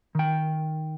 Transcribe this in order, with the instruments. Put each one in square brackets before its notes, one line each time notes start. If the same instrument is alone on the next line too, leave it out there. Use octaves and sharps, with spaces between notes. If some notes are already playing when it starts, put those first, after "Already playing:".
[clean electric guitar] D#3 G5